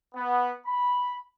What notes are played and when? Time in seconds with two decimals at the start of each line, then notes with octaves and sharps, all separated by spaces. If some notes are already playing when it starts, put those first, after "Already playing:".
0.15 B3
0.66 B5